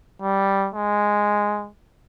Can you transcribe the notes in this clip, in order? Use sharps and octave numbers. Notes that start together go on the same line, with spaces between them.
G3
G#3